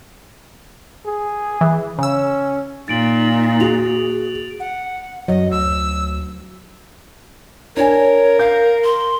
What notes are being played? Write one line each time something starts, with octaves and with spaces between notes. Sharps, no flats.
G#4
E3
C#3 C#4 E6
A#2 D#4 A6 D7 F#7
F#4 G#4 F7
F#5
F#2 F#3 D#5
D2 E6
D4 A#4 C#5 G#5
F5 G6
C6